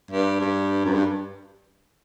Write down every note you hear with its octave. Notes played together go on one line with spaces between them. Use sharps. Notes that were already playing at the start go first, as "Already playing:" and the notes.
G2
G2
F#2
G2